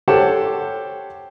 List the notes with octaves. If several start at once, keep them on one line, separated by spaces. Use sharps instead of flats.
G4 A4 C5 C#5 F#5 A5